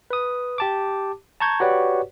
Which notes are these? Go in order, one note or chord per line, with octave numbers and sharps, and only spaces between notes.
B4 D#6
G4 A5 D6
A5 A#5 C#6 G6 G#6
F#4 G4 B4 C#5 D5 F#5